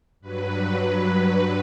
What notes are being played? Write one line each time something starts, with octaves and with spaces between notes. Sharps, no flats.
G2 F#3 B4